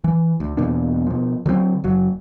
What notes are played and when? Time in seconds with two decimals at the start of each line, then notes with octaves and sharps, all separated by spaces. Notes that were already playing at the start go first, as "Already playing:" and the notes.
0.04 E3
0.40 D2
0.57 E2 B2 A#3 D4
1.07 B2 F3
1.46 D3 F#3 A3 C4
1.84 F#1 F#3